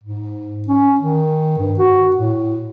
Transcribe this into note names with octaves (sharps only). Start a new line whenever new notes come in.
G#2
C#4
D#3
G2
F#4
A2